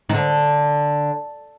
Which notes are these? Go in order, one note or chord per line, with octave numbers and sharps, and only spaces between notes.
D#3
D3